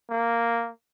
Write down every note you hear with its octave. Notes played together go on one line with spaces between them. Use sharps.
A#3